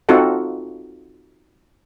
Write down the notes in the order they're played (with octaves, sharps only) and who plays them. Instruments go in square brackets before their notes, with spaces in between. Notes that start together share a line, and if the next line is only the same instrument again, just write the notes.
[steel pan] C4 D#4 F4 F#4 A4 F#5